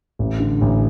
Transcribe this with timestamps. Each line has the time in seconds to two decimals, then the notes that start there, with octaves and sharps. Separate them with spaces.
0.19 A1
0.40 D3
0.61 A1